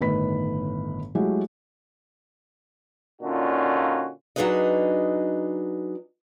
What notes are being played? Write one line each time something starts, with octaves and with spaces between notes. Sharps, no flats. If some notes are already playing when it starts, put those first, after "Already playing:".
G1 A2 D#3 B4 B5 B6
F#3 G#3 A3 E4 F#4 G4
A#2 D3 C#4 D#4 F4 F#4
F#3 D4 D#4 G#4 B4 D#5